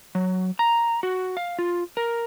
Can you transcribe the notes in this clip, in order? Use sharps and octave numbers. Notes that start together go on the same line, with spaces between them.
F#3
A#5
F#4
F5
F4
A#4